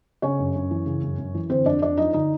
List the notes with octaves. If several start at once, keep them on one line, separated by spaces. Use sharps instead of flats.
C#3 C#4 C#5
F#2
F#2
E3
C#3
F#2
F#2
E3
D3 C4 C5
F2 D4 D5
F2 D4 D5
F3 D#4 D#5
D3 D#4 D#5